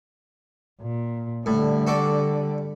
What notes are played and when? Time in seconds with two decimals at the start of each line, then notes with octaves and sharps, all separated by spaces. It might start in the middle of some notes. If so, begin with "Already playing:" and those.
0.81 A#2
1.46 A2 D3 G3
1.87 F#4 A4 D5